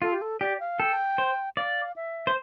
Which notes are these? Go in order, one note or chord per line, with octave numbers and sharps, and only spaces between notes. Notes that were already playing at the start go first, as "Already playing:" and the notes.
F4 A4
G4
A4
G4 D5
F5
A4 G5
C5
D5 F5
E5
C5